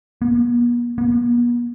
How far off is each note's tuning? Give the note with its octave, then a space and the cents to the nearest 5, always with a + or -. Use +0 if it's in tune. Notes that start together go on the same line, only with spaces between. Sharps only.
B3 -45
B3 -45